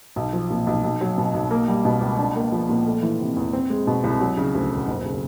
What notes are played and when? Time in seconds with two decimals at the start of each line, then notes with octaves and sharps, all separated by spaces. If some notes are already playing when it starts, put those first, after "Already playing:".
0.16 B1
0.33 F3
0.50 A#2
0.67 B1
0.84 B1
1.01 F#3
1.18 B2
1.34 B1
1.51 A#3
1.68 G3
1.85 B2
2.01 C#2
2.18 D4
2.36 A#3
2.52 F3
2.69 A#2
2.86 A3
3.03 E3
3.20 C3
3.36 E2
3.53 C4
3.70 G#3
3.87 B2
4.04 C2
4.21 F#3
4.37 C#3
4.54 D2
4.71 E1
4.88 F#1
5.05 C#3